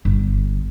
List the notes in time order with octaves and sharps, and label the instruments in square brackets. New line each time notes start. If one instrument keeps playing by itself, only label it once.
[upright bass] G1